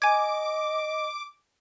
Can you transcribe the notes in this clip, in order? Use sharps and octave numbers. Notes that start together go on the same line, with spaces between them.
D#5 G#5 D6 G#6